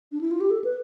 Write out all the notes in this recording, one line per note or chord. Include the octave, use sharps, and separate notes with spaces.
D4
E4
F4
G4
A4
B4